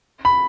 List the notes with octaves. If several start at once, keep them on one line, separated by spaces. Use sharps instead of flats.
B5